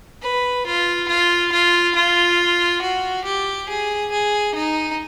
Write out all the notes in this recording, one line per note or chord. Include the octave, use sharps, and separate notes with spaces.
B4
F4
F4
F4
F4
F#4
G4
G#4
G#4
D#4